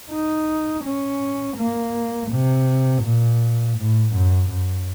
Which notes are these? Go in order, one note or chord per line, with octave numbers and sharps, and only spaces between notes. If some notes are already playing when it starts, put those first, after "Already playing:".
D#4
C#4
A#3
C3
A#2
A2
F#2
F#2